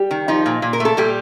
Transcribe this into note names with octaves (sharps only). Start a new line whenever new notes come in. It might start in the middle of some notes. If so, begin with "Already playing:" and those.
Already playing: G3 G4
D#3
F3 D#4
A#2
A#2
A#4
A3
A4
A#2 G3 G4